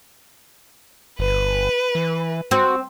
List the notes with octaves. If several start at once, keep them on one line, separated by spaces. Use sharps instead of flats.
G1 B4
E3
C4 F#4